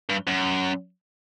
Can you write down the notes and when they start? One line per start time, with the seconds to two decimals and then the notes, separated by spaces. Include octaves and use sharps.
0.10 G2
0.27 F#2